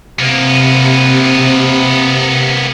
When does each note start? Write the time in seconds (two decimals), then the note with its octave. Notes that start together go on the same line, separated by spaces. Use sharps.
0.19 C3 A#3 B3